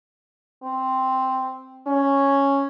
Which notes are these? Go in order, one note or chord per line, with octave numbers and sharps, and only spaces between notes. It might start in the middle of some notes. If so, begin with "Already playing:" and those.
C4
C#4